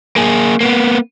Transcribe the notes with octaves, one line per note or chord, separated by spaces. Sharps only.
A#3 G#4
A#3 B3